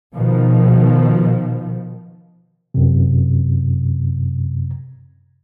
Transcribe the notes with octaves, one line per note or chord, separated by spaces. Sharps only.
B2 D#3 F3
F#2 C3